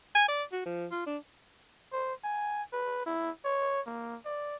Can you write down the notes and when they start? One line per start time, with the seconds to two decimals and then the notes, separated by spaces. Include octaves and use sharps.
0.15 G#5
0.28 D5
0.52 F#4
0.66 F3
0.91 F4
1.06 D4
1.92 C5
2.24 G#5
2.73 B4
3.06 E4
3.45 C#5
3.86 A#3
4.25 D5